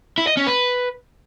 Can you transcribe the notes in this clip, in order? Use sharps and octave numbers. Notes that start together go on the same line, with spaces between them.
E4
D#5
C#4
B4